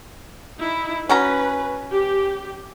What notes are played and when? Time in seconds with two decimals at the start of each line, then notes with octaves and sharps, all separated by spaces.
0.58 D#4 E4
1.09 C#4 F#4 B4 A#5
1.92 G4